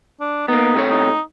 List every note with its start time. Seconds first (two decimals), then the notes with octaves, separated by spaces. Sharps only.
0.20 D4
0.48 A#3 B3 D#4
0.74 C3 A3 C#5
0.90 D#4